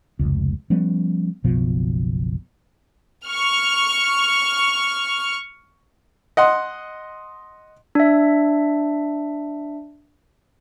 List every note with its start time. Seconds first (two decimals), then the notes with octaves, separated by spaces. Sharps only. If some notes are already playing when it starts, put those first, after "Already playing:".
0.19 F1 C#2
0.70 F3 G3 B3 C#4
1.44 F#1 B1 B2 F3
3.26 C#6 F6
6.37 D#5 F#5 C6
7.95 D4 E5